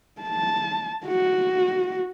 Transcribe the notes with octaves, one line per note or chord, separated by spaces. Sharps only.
A5
F#4